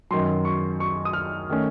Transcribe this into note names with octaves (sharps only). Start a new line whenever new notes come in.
F#2 D#3 F#3 C6
C#6
C#6
D#6
F6
D#3 A3 C#4